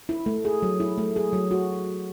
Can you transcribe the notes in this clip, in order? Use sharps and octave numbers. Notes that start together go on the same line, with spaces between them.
E4
A3
G#4
F#3
E4
A3
G#4
F#3
F#4